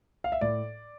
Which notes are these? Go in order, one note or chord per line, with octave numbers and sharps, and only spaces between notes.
F5
E5
A2 D5